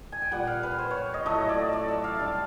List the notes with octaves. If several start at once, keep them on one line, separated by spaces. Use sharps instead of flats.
G#5
G5
A#2 G3 F#5
F5
B4
C5
C#5
D#5
A2 F#3 A3 D#5
D5
D5
E5
F5
D3 G3